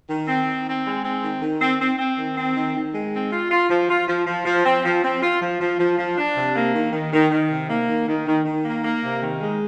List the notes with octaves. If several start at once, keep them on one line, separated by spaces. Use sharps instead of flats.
D#3
C4
D#3
C4
G#3
C4
D#3
D#3
C4
C4
C4
D#3
C4
D#3
D#3
G#3
C4
F4
F4
F3
F4
F3
F3
F3
C4
F3
C4
F4
F3
F3
F3
F3
D4
C3
A#3
D#3
D#3
D#3
D#3
C3
A#3
D#3
D#3
D#3
D#3
A#3
A#3
C3
D#3
G#3